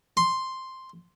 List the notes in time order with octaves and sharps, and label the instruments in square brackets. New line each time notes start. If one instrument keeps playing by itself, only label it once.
[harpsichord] C6